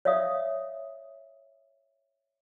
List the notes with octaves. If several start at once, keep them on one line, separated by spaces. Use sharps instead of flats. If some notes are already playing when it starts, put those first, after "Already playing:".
C#5 D5 E5 F5 D#6